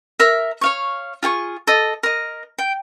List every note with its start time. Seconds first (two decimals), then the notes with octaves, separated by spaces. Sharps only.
0.19 A#4 E5
0.61 C#5 F5 C#6
1.23 F4 G#4 G#5 C#6
1.67 A4 D#5
2.03 A#4 D#5
2.58 G5